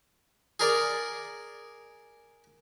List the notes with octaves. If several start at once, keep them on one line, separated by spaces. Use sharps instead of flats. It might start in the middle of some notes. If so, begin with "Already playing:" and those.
G#4 A#4 D5